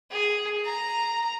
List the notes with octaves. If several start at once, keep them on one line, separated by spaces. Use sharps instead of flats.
G#4
A#5